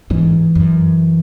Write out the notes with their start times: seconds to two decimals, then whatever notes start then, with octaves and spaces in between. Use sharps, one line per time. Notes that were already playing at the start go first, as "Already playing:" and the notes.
0.10 G#2 E3
0.55 F#2